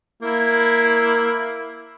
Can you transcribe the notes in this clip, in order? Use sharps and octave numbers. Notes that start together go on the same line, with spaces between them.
A#3 E4